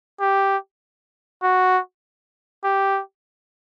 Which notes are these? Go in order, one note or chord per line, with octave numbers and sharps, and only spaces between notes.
G4
F#4
G4